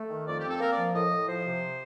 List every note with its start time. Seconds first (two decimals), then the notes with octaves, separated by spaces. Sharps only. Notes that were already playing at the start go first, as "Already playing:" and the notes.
Already playing: A3
0.09 D#3
0.26 F2 D5
0.38 G4
0.44 C4 A4
0.60 A#3 A#4
0.72 D5
0.77 F3
0.94 A2 D#5
1.11 A2
1.28 F3 C5
1.45 C3